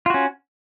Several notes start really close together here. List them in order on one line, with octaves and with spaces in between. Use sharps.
F4 F#4 C#4